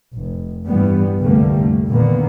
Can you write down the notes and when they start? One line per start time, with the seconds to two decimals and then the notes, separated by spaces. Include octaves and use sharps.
0.14 F1
0.65 G2 E3 G3 B3
1.18 C2 F2 D3 G3 A3 A#3
1.87 A#2 D3 D#3 A#3 B3